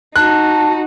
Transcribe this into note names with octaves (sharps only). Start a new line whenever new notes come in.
D#4 F#4 A5 F#6